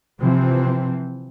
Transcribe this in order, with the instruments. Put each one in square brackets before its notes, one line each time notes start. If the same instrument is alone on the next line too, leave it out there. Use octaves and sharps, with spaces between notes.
[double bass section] C3 E3 F3 C4